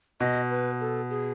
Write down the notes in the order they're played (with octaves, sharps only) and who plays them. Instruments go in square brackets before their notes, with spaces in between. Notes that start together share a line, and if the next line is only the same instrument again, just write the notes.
[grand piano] B2 [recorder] D#5
[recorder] B4
A4
G#4